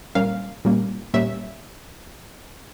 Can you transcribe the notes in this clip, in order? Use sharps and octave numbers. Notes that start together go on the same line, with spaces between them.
A#2 G3 A#3 C#4 F5
A#2 G3 A#3 C#4
A#2 G3 A#3 C#4 E5